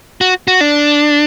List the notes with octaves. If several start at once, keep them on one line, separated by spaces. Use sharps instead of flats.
F#4
F#4
D4